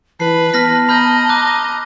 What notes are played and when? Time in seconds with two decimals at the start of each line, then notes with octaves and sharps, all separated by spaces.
0.20 E3 B4 A5 C7
0.54 B3 A5 F6 A#6 B6
0.89 D#5 A#5 B5 F6 G6
1.29 D6 F#6